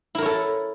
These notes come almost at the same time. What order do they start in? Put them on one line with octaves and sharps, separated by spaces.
E4 A#4 C#5 A4